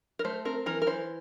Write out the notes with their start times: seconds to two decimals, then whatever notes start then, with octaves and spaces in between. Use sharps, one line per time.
0.19 A#4
0.25 A3 C5
0.45 C4 A#4
0.66 E3 A#4
0.82 A#4
0.87 E3 C5